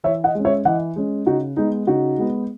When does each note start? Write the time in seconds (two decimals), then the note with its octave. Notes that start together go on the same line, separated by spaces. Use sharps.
0.04 E3 C#5 E5
0.24 D#5 F#5
0.35 G#3 C#4
0.45 C#5 E5
0.65 E3 D#5 F#5
0.96 G#3 C#4
1.26 C#3 D#4 F#4
1.57 G#3 B3 D#4
1.87 C#3 D#4 F#4
2.18 G#3 B3